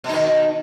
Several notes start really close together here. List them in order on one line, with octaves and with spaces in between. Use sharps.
B2 D#4 D#3